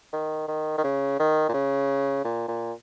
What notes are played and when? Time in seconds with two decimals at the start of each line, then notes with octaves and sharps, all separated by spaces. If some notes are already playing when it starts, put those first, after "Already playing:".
0.13 D#3
0.48 D#3
0.78 D#3
0.84 C#3
1.19 D#3
1.49 A#2
1.54 C#3
2.25 A#2
2.48 A#2